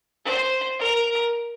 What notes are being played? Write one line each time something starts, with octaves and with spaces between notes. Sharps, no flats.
C5
A#4